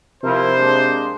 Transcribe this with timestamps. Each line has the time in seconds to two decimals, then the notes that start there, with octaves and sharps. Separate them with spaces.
0.23 C3 F3 E4 A#4 C5
0.57 G#3 A#3 D4